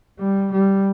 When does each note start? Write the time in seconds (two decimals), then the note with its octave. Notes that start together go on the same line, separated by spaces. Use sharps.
0.19 G3
0.53 G3